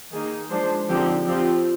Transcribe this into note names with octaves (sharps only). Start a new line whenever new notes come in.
D#3 A#3 D#4 G#4
F3 G#3 D4 C5
D3 F3 C4 D#4 G4
F3 C4 F4 G4